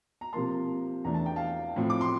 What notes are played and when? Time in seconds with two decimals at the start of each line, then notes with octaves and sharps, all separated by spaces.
0.21 A#5
0.33 C3 F3 A#3 A5 C6
1.05 E2 E3 A3 D4 A#5
1.14 A5
1.26 G5
1.36 F5 A5
1.76 A2 F3 C4
1.90 D6
2.01 C6